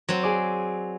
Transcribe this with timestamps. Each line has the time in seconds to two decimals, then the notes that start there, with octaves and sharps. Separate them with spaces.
0.09 F#3 C4
0.23 G#4 D5